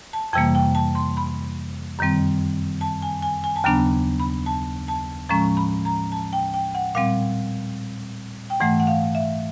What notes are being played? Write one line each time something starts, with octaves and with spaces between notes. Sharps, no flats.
A5
F2 C3 E3 G3 A#3 G5
G5
A5
C6
B5
F#2 D#3 G3 C4
A5
G#5
G#5
G#5
A5
D#2 C#3 F#3 B3 D4 A#5
B5
A5
A5
A2 F3 G#3 C#4 A#5
B5
A#5
A5
G5
G5
F#5
A#2 G3 C4 F5
G5
G#2 E3 A3 F#5
F#5
F5
E5